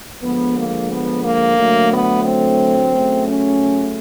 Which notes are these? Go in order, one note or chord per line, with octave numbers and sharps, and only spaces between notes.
D3 F3 G#3 B3
A#3
B3
A#3
D3 F#3 A3
B3
C4
C#3 F#3 A3
C#4